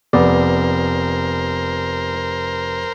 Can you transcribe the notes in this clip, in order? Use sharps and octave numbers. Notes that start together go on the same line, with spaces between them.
F1 B3 A#4 C5 D5